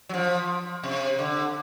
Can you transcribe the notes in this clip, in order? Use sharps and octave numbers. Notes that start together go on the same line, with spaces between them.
F#3
F3
C3
D3